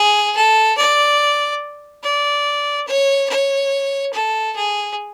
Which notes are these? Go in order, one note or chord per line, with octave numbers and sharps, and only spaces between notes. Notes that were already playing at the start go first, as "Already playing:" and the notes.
Already playing: G#4
A4
D5
D5
C#5
C#5
A4
G#4